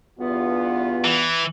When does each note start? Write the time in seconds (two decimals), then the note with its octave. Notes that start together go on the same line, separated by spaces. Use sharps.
0.19 E2 G2 B3 F4
1.05 E3